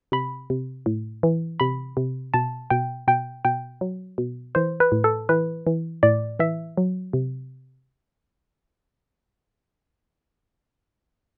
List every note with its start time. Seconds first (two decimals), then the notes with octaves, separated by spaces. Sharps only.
0.12 C3 B5
0.50 C3
0.86 A2
1.23 E3
1.60 C3 B5
1.97 C3
2.34 B2 A5
2.70 B2 G5
3.08 B2 G5
3.45 B2 G5
3.81 F#3
4.18 B2
4.55 E3 C5
4.80 B4
4.92 A2
5.04 A4
5.29 E3 B4
5.67 E3
6.03 A2 D5
6.40 E3 E5
6.78 F#3
7.13 C3